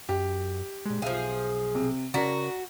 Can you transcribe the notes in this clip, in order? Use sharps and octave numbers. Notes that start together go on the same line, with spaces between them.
F#2 G4
A#2 G#3
B1 F3 G#4 E5 F5
C3
C#3 C#4 F#4 A#4 D5 A#5 B6